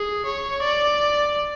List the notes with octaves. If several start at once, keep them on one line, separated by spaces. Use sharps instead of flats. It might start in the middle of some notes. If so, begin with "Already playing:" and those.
Already playing: G#4
C#5
D5